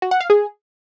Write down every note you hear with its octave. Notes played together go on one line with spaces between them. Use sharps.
F#4
F#5
F5
G#4